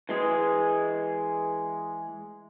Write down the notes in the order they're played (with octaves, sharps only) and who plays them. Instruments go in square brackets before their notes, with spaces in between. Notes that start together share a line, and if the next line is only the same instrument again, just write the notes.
[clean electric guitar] E3 G#3 G#4